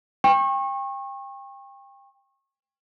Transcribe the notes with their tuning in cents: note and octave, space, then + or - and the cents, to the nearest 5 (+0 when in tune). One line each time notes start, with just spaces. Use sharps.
G5 +25 C#6 -30